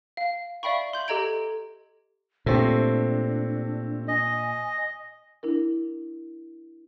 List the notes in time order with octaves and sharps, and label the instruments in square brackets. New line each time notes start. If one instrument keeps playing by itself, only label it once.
[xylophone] F5
D5 E5 F5 G5 B5 C#6
C6 G6 F#7
G4 A4 D#5 A#5 G#6 D7
[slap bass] A#2 [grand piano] A3 C4 G4 [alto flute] D4
[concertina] D#5 [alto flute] G#5
[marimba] D4 E4 A#4